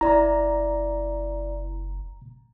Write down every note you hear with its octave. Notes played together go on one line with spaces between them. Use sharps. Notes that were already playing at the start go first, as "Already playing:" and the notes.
F#1 E4 D5 A#5